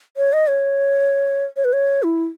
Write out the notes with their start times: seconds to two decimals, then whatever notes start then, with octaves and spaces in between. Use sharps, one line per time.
0.17 C#5
0.33 D#5
0.47 C#5
1.57 C#5
1.64 B4
1.73 C#5
2.03 E4